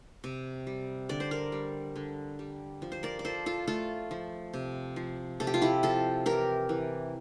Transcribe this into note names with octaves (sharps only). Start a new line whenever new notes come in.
C3
G3
D3 D5
C5
A#4 D5
G3
D3
G3
F3
C5
A#4 D5
D5
F3 A4 C5
F4 A4
A3 F4 A4
F3
C3
F3
C3 A4
G4
F4
E4 G4
F3 F4 A4
E3 G4 A#4
E3